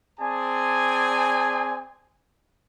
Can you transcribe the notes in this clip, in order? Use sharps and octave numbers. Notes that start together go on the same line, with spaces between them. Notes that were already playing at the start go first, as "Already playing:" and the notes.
C4 G#4 D5 G#5 A5